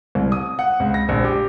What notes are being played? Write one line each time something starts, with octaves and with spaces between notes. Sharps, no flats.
C2
D#6
F#5
C#2
A#6
A#1
G4